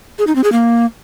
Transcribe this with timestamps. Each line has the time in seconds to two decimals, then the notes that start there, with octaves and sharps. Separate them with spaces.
0.19 G#4
0.27 D#4
0.35 C4
0.44 G#4
0.52 A#3